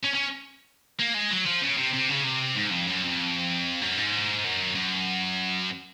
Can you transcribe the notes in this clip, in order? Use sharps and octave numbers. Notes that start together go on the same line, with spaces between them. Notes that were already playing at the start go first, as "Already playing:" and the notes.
C#4
C#4
A#3
G#3
F#3
F3
C#3
C3
C3
C#3
C3
G#2
F2
F#2
F2
F#2
G#2
F#2
F#2